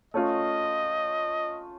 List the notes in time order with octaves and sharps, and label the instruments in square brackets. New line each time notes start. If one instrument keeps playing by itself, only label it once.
[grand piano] A3 C#4 F4 [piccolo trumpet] D#5